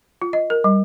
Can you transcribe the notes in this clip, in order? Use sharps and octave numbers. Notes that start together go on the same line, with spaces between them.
F4
D#5
A#4
G3